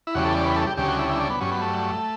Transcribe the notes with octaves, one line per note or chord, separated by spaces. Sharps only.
E4
E2 C#3 G3 F#4
A4
D5
B4
A4
G4
D2 C#3 G3 G4
F#4
E4
E4
D4
B3
G2 F#3 C#4
B3
A3